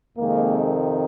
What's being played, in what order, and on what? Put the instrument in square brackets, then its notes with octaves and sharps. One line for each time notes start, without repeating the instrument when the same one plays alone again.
[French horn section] F2 C3 D#3 G#3 A#3